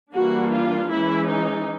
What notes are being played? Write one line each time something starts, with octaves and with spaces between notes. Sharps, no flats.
E3 G3 A#3 D4 F#4
F4
E3 G#3 C#4 E4
D#4